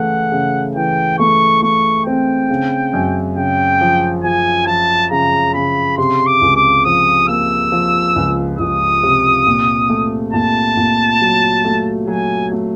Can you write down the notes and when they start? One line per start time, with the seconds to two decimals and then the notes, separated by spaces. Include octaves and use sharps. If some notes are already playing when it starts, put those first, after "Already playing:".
Already playing: C#3 E3 A3 F#5
0.32 C#3
0.76 E3 G5
1.19 A3 C#6
1.62 A3 C#6
2.06 C4 G5
2.50 C#3
2.93 F#2
3.37 C#3 G5
3.81 F3
4.24 F3 G#5
4.67 F3 A5
5.11 C#3 A#5
5.54 C#3 B5
5.98 C3 C6
6.27 D6
6.41 C#2
6.56 D6
6.85 F3 D#6
7.28 A#3 E6
7.72 F3
8.16 C#2
8.59 C#2 D#6
9.03 C3
9.47 A#2
9.90 A3
10.33 A#2 A5
10.77 A#2
11.21 F#3
11.64 A3
12.07 F#3 G#5
12.52 A3